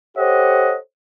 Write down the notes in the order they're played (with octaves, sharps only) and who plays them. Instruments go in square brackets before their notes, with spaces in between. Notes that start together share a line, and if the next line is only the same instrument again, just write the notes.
[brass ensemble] G4 A4 C5 C#5 D#5 F#5